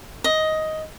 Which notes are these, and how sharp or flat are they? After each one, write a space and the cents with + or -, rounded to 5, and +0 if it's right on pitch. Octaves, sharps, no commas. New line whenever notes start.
D#5 +10